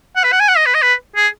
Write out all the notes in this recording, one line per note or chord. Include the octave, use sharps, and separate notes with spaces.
F#5
B4
F#5
G#5
F#5
D#5
B4
D#5
B4
G#4